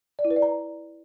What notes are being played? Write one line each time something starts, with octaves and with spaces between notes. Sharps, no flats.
D5
E4
B4
D5
A#5